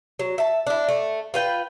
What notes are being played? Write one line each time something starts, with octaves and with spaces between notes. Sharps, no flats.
F#3
E5 A5
D4 E4
A3
F4 B4 G5